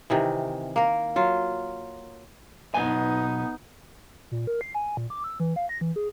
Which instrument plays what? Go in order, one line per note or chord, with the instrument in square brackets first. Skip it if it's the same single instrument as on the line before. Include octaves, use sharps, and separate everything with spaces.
[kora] C3 D#3 E3
A#3 A#4
F#3 F4
[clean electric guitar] B1 G#5 [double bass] B3 D#4
[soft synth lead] A#2
A#4
C7
G#5
A#2
D6
E6
E3
F5
A#6
E3
G#4